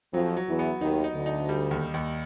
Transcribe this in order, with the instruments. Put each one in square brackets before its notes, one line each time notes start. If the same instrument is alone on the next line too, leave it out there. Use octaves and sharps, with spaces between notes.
[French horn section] F2 F3 [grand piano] F#3
[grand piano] F#3
[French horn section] E2 E3
[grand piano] B3
[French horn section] D#2 D#3 [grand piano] D#4
[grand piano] D#4
[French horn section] D2 D3
[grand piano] D#4
G3
D#2
D#2